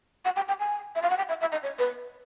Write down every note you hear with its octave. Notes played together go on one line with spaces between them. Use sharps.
F#5
G5
G5
G#5
E5
F5
F#5
G5
E5
E5
D#5
C#5
B4